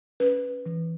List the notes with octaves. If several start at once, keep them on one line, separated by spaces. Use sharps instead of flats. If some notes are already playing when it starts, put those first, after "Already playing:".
C#4 B4
E3